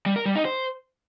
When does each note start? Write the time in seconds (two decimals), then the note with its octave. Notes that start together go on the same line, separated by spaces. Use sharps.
0.06 G3
0.16 A#4
0.26 G3
0.35 D#4
0.45 C5